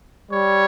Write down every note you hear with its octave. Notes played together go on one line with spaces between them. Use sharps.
G3 C#5